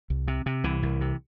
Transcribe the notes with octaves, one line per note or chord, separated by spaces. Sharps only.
C2
C3
C3
C2 E3
C2
C3